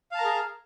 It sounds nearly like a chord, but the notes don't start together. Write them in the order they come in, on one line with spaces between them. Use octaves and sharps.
F5 A5 A#5 A#4 G#4